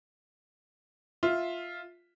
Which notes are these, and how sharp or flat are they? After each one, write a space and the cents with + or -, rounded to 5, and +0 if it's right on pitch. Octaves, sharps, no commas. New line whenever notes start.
F4 +0 E5 -5